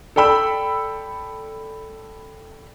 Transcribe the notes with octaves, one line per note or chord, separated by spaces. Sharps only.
A4 D5 G5 B5 E6